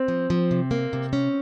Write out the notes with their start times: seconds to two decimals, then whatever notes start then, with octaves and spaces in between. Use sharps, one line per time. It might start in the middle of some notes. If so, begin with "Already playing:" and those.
Already playing: C4
0.08 F3
0.30 F3
0.51 C3
0.71 A#3
0.93 C3
1.13 C#4